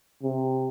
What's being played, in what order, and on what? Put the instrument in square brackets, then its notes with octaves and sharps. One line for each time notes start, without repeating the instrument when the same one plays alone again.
[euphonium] C3